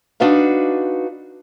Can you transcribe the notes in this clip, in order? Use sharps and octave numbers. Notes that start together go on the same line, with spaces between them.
D4 D#4 F#4 B4 F5